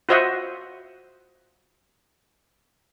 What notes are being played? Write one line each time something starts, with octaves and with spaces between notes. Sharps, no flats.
F4 F#4 C5 D#5 E5 F#5